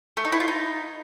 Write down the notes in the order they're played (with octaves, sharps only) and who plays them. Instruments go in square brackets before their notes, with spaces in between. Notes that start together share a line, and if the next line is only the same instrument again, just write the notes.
[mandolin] A3
D#4
E4
F4
D#4